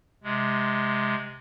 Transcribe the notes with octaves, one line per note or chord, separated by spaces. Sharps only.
C3 G#3